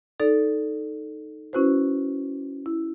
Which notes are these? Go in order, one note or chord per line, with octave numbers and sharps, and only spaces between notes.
D#4 A4 D5
C#4 E4 F#4 B4 C5
E4